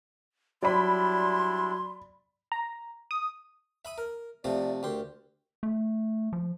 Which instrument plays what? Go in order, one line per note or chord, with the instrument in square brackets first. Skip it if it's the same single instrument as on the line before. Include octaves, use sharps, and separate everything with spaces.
[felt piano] F#3 [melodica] G3 D4 E4 [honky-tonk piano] D5 B5 [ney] C6
[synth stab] A#5
D#6
[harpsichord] E5 B5 D#6
A#4
[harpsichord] C3 F3 A3 [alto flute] D5
[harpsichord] D2 G4 C6 [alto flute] A#4
[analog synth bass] A3
F3